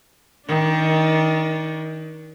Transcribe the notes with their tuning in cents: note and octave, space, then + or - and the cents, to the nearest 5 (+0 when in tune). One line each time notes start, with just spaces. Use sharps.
D#3 +25 D4 +0